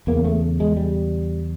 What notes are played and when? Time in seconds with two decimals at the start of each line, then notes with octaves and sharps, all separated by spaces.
0.07 E2 C#3 A#3
0.25 A3
0.60 G#3
0.77 G3